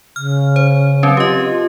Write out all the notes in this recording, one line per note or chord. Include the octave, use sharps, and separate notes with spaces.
C#3 F6
C5
F#3 C4 C#4
F4 G4 D#5